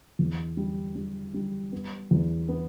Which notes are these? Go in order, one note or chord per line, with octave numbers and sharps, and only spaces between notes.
E2
G3
G3
G3
B3
E2
B3